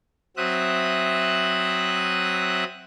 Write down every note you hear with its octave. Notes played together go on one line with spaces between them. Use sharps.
F#3 C4 E5 D#6 F#6